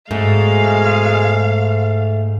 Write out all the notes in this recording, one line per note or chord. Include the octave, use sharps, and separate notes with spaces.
G#2 B2 G#3 A3 F5